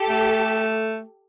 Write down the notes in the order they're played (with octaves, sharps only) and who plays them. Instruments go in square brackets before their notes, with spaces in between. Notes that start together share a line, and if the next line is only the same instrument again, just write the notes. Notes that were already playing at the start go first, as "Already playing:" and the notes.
Already playing: [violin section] G4 A4
[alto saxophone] A3